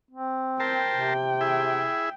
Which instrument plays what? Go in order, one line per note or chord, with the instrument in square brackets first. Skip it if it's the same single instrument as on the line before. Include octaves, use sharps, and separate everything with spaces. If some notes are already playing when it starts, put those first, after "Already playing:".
[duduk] C4
[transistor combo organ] A#4 C5 A5 [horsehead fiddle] G5
[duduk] C3
[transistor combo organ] E4 G#4 E5